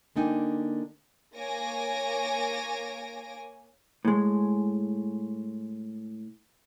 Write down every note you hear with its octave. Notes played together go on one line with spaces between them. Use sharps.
D3 A#3 D4 D#4 G5 G#5
A#3 C#5 G#5 A#6 D7
A2 G#3